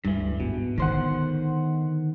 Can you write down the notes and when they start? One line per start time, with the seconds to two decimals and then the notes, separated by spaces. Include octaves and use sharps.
0.05 D2 G2 E3 A#3
0.40 G#1 B2
0.78 D3 D#3 B3 C5 F#5